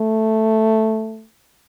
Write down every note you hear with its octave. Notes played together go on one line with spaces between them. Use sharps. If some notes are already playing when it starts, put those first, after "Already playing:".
Already playing: A3